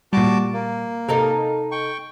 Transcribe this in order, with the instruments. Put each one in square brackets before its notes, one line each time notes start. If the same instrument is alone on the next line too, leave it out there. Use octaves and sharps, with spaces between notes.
[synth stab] A#2 G3 [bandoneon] F#4 A5 D6
[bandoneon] A#3
[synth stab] C3 [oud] D#4 A4 A#4
[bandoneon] G5 C#6